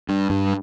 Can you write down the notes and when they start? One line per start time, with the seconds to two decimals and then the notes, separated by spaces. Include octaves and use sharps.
0.09 G2
0.30 G2